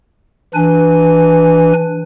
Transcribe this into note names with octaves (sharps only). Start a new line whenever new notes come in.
E3 D4 B4 G#5